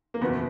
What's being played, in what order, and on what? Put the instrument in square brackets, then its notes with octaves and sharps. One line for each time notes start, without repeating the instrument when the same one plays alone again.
[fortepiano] A#3
[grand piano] F#1 E2 B2 [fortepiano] B3